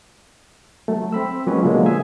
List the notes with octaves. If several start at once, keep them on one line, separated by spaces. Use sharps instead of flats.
F#3 A3
C4 B5 E6
F3 F#3 G#3 A#3 C#4 B4
B2 D3 F3 F#3 G#3 A#3
G#4 E5 G#5